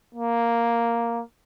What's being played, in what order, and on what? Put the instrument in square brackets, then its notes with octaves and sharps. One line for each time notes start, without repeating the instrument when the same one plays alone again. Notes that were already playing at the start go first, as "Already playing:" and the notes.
[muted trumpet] A#3